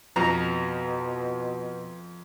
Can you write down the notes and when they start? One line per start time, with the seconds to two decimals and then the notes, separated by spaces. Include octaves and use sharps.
0.16 F2 B2 F3 A#5